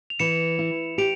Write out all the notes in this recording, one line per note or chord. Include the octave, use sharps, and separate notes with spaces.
F7
E3 C#7 E7
E4
G4 D7 F7